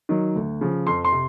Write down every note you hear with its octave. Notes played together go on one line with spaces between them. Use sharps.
D#3 F#3
D2
C#3 F3
F2 C6
C6
C3